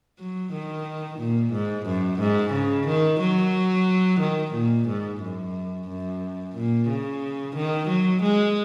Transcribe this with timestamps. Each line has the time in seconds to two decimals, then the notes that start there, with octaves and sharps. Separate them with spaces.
0.19 F#3
0.53 D#3
1.19 A#2
1.53 G#2
1.86 F#2
2.20 G#2
2.53 C#3
2.87 D#3
3.20 F#3
4.21 D#3
4.54 A#2
4.88 G#2
5.21 F#2
5.88 F#2
6.56 A#2
6.89 C#3
7.56 D#3
7.88 F#3
8.22 G#3